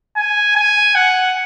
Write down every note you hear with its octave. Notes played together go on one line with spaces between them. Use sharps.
G#5
G#5
F#5